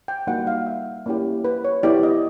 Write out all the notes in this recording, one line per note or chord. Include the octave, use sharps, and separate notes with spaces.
G5
G3 A#3 D#4 F#4 F#5
F5
E5
A#3 C#4 E4 G4
B4
C#5
B3 E4 G4 D5
D#5